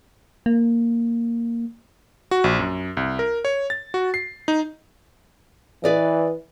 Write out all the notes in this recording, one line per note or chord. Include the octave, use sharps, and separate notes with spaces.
A#3
F#4
A#1
F#2
C2
A#4
C#5
A6
F#4
C7
D#4
E3 B4 D5 D#5